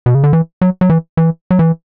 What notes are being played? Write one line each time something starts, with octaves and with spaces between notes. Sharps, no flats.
B2
C#3
D3
E3
F#3
F#3
E3
E3
F#3
E3